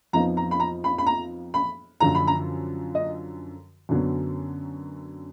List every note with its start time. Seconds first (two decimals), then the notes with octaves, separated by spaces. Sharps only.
0.13 F2 F3 B3 D#4 A#5
0.37 A#5
0.51 B5
0.60 A#5
0.84 B5
0.98 B5
1.06 A#5
1.54 B5
2.00 F#2 D3 F3 A#5
2.15 B5
2.27 A#5
2.95 D#5
3.89 F#2 D3 F#3 B3